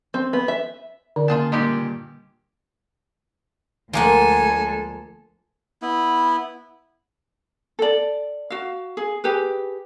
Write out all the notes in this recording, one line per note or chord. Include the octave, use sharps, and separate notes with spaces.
C4
B3
E5
D3 D4
C#3 A#3 F4 G#4 G5 A5
G2 A#2 G#3 D#4 G4
D2 F3 G#3 A#3 A4 F#5 G#5
B3 E4
A4 D5
F#4 F5
G#4
G4 G#4 B4